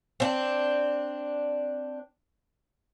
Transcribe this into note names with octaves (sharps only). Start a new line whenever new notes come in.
C4 D4